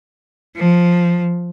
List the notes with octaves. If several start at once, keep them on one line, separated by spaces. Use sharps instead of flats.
F3